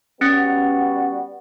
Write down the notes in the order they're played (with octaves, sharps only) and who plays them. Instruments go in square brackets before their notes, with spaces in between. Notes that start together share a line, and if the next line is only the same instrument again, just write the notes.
[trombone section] G3 B3 F#4 [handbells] C#4 A6 C#7